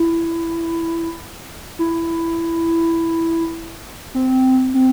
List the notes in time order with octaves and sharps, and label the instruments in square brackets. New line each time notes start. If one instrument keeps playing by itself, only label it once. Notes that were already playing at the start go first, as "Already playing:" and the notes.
Already playing: [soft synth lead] E4
E4
C4
C4